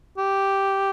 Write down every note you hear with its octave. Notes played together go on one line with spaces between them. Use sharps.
G4